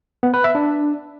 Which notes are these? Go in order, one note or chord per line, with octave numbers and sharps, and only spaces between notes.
B3
B4
E5
D4